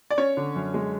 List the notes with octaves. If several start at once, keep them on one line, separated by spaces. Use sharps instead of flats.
D5
C#4 C#5
D3
F#2
G#3